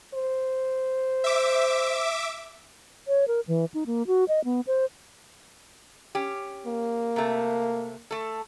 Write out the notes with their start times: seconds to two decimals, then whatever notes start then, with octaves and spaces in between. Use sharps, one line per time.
0.14 C5
1.24 E5 D6
3.08 C#5
3.28 A#4
3.48 E3
3.74 D#4
3.86 A#3
4.07 F#4
4.28 D#5
4.44 B3
4.67 C5
6.15 C#4 G4
6.67 A#3
7.16 C3 A3
8.11 A3 A4